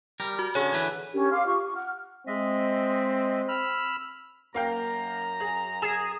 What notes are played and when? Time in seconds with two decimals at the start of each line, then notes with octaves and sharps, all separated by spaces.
0.20 G3 A#4
0.39 F#4
0.55 D3 C#4 G#4 C#5
0.73 D3 E3 B4 G#6
1.13 C#4 D4 G4 A#4
1.30 F5 C6 D6 F6
1.45 F4 G4 C#6
1.64 C#6
1.75 F#5 F6
2.27 G#3 C4 D#5 E5
3.48 B5 E6 F6
4.54 F#2 A#3 F5 G5 A#5
5.40 G#4
5.82 G#4 E7